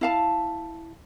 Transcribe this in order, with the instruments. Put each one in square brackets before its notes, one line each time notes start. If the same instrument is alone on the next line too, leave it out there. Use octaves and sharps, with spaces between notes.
[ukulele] E4 F5 A5